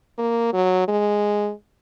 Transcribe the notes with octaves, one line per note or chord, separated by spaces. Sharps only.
A#3
F#3
G#3